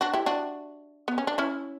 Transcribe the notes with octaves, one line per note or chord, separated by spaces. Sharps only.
D4 F#4
E4 G4
D4 F#4
B3
C#4
D4
C#4 E4